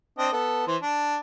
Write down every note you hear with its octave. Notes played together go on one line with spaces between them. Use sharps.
C4 D4 D#5
B3 A4
E3 C5
D4